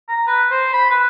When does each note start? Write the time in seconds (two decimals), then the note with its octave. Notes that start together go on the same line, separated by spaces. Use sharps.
0.09 A#5
0.27 B4
0.51 C5
0.73 B5
0.91 B4